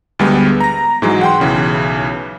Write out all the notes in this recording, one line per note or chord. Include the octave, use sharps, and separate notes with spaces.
D2 G3 G#3 B3
A#5 A#6
G#2 E3 F#3 G#3
F#5 G5 C6
B1 C#3 E3